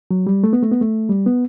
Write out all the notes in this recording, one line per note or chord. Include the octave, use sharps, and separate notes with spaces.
F#3
G3
A3
B3
A3
B3
A3
G3
B3